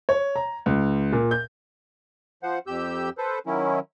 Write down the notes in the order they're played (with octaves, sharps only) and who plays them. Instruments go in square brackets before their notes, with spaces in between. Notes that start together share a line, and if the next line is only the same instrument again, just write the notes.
[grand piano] C#5
A#5
C#2
A#2
G6
[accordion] F3 C5 F#5
F2 G4 E6 G6
A4 B4 C5
D#3 F#3 C#4 E4